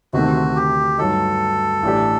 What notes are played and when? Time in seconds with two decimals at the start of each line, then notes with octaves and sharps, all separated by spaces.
0.13 D2 C3 D#3 A3 C4 F#4
0.56 G4
0.98 G2 F#3 A3 D#4 A4
1.83 A1 A2 A3 D4 G4